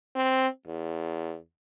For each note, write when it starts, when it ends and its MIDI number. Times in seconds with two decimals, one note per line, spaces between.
0.16 0.48 60
0.67 1.36 40